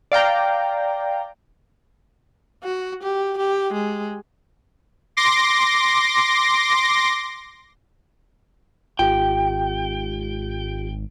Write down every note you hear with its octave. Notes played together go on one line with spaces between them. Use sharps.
D5 F5 G5 A#5
F#4
G4
G4
G#3
C6 D6 A#6
G#1 F4 G4 G5